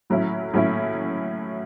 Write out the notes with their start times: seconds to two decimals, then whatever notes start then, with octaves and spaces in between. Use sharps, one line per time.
0.10 A2 F#3 C#4 E4
0.53 A2 F#3 C#4 E4